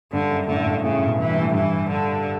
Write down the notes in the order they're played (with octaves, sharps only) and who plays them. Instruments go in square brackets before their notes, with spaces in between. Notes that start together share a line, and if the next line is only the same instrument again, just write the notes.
[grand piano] G2 [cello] D3
[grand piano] F#2
[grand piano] A2 [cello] D3
[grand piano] G2
[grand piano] A2 [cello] C#3
[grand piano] B2
[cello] E3
[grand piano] G2
A2
[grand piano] G2 [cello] E3
[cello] D3